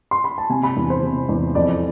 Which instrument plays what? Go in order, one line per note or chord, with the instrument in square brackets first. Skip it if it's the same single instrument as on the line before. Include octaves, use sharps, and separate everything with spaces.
[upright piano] C6
B5
A5
C3 G#5
B5
E2
C5
C3
E2
F2 D5